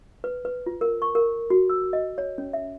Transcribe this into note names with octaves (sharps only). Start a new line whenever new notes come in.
B4
B4
F4
A#4
C#6
A#4
F#4
E6
D#5
C#5
C#4
E5